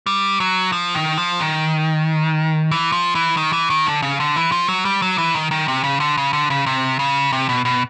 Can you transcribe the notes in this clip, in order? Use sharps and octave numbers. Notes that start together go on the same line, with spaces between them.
G3
F#3
F3
D#3
F3
D#3
E3
F3
E3
D#3
E3
D#3
D3
C#3
D3
E3
F3
F#3
G3
F#3
E3
D#3
D#3
C3
C#3
D3
C#3
D3
C#3
C3
C#3
C3
B2
B2